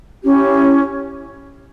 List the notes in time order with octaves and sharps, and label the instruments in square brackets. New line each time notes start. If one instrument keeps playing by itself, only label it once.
[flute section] C#4 E4 G4